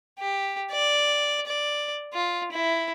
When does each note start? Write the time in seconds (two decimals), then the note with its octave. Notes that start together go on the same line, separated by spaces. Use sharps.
0.19 G4
0.72 D5
1.47 D5
2.14 F4
2.52 E4